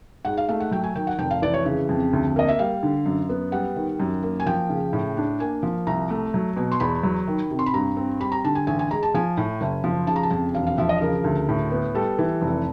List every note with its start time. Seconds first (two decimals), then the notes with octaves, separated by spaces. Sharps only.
0.25 G#2 F#5
0.38 F5
0.49 A3 F5
0.60 F#5
0.71 F#3 G5
0.84 G#5
0.95 D#3 G5
1.07 F#5
1.18 F1 G5
1.31 F5
1.42 E3 D5
1.54 C#5
1.65 C#3
1.89 F2
2.13 D2
2.36 A#3 D#5
2.49 E5
2.59 G3 F5
2.83 D3
3.06 F#2
3.29 B3
3.52 G3 F#5
3.76 D#3
4.00 F#2
4.23 A#3
4.40 G#5
4.46 F3 G5
4.70 C#3
4.93 A2
5.17 D4
5.40 A#3 G#5
5.63 F3
5.87 C2 A#5
6.10 A3
6.34 F#3
6.57 B2
6.72 C6
6.80 E2 B5
7.03 F#3
7.27 D#3
7.51 C3
7.59 C6
7.66 B5
7.74 G2 A#5
7.97 C4
8.20 G3 B5
8.32 A#5
8.44 D3 A5
8.55 G#5
8.67 A1 G#5
8.79 G#5
8.91 G#3 A#5
9.03 A5
9.14 F3 G#5
9.37 A2
9.61 F#1
9.84 F3
10.07 C#3 A5
10.16 A#5
10.23 A5
10.31 F2
10.55 E1 F5
10.67 F5
10.78 F3 E5
10.89 D#5
11.01 C#3 A#4
11.24 D2
11.49 A2
11.72 B3
11.95 G3 A4
12.18 E3
12.42 F1